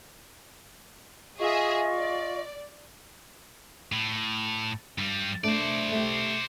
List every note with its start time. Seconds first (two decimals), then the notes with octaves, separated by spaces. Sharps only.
1.39 F4 G#4 D#5 E5 C#6
1.93 D5
3.92 A2
4.98 G2 G3
5.44 A3 D4 C5 D5
5.92 A3 G4